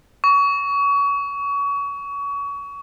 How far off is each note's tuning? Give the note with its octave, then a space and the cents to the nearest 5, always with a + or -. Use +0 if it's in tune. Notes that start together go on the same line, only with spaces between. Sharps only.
C#6 +30